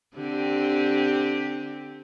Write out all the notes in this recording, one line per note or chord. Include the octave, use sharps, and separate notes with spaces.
D3 C4 G4